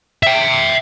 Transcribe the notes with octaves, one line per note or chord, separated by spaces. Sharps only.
E5 G5